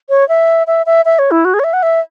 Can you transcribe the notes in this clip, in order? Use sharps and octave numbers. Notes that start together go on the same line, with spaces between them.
C#5
E5
E5
E5
E5
C#5
E4
F#4
G#4
C#5
E5
F#5
E5